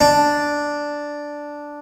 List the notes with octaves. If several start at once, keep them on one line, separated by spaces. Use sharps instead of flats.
D4